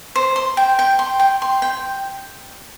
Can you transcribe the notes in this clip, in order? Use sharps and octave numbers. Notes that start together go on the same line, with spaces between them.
C5
C6
G5
G5
C6
G5
C6
G5